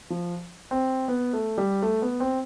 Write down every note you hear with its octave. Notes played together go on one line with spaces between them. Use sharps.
F3
C4
B3
A3
G3
A3
B3
C4